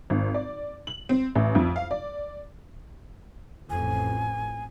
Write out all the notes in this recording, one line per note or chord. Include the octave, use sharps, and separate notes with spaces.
G#1
D5
F#7
C4
A1
F2
F5
D5
A1 F2 G#5